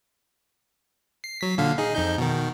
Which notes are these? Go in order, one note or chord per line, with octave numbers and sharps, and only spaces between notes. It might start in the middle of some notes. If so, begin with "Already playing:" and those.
C7
F#3 B6
A#2 D3 F5
D#4 G#4
F2 D#4 G6
B2 D#3